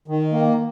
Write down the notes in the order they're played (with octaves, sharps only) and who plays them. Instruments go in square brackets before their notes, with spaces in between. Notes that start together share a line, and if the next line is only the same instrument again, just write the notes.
[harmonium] D#3
A#3